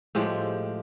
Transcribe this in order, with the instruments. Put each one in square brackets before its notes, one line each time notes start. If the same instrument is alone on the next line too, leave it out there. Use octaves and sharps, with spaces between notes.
[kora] A2 F3 G#3 G4